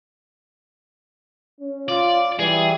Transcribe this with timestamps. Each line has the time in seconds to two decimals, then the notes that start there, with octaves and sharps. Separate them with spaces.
1.60 C#4
1.89 F4 D5
2.39 E3 G3 G#4